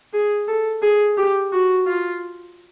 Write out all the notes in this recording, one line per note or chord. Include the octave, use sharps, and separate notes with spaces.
G#4
A4
G#4
G4
F#4
F4